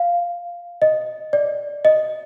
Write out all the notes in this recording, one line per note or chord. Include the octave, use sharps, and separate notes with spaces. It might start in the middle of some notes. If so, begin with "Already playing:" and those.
Already playing: F5
D#5
D5
D#5